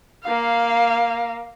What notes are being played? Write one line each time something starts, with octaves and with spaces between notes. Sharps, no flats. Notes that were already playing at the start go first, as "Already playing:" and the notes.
A#3 F5